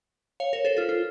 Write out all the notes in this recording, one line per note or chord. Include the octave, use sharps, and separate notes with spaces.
C#5 F5
A#4 C#5
A4 C5
F4 A4
F4